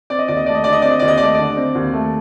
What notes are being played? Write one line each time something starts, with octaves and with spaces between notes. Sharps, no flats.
C4 D5
D#5
D#2 D5
D#5
A3 D5
D#5
D3 D5
D#5
C4 D5
D#5
D#2 D5
D#5
A3 D5
D#5
D3 D5
C4
D#2
A3